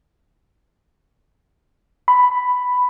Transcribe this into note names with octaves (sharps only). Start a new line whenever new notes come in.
B5